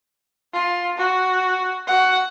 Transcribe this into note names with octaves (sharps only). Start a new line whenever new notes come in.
F4
F#4
F#4 F#5